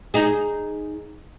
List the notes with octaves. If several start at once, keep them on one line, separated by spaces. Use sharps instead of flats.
D#4 G#4